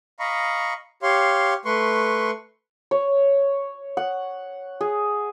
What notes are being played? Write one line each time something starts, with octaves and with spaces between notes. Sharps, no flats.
D#5 F5 A#5 B5 C#6
G4 C#5 F5 C6
A3 B4 C6 C#6
C#5
F#5
G#4